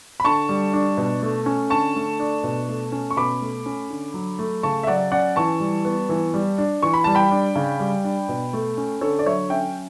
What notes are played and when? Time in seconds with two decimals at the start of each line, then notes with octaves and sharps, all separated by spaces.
0.20 B5
0.25 D3 A5 C#6
0.49 G3
0.73 D4
0.97 B2
1.22 A3
1.46 C#4
1.70 D3 A5 C#6
1.95 A3
2.20 D4
2.44 B2
2.68 A3
2.92 C#4
3.11 C#6
3.17 B2 B5 D6
3.41 A3
3.66 C#4
3.90 D3
4.14 F#3
4.39 A3
4.63 C#3 A5 C#6
4.83 E5
4.87 F#3 D5 F#5
5.12 C#4 D5 F#5
5.36 E3 A5 C#6
5.60 G3
5.85 B3
6.09 E3
6.34 G3
6.58 D4
6.83 E3 C#6
6.94 B5
7.04 G3 A5
7.15 G5 B5
7.31 D4
7.56 C#3
7.80 G3
8.04 D4
8.29 B2
8.53 A3
8.77 C#4
9.01 D3 A4 C#5
9.19 D5
9.26 F#3 C#5 E5
9.50 C#4 E5 G5